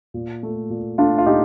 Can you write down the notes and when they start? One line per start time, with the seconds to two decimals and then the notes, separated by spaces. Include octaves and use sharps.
0.14 A#2
0.43 A3
0.70 A#2
0.98 A3 D4 F4
1.18 F4
1.26 A#2 D#4 G4